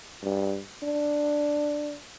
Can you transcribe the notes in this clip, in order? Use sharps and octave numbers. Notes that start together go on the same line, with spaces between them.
G2
D4